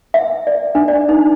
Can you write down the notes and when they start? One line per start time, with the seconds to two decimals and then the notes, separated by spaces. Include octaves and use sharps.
0.14 E5
0.47 D5
0.75 D4
0.88 D5
1.09 D#4